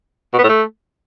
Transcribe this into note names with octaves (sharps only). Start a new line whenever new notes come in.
B2
B3
A2
A3